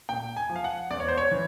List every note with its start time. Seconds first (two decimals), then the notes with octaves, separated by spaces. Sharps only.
0.09 A#2 G5
0.37 G#5
0.50 F3
0.56 F5
0.64 F#5
0.91 E2 D5
1.00 C#5
1.08 C5
1.18 C#5
1.31 E3